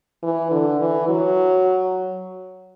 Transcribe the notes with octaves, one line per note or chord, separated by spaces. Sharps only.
E3
D3
E3
F#3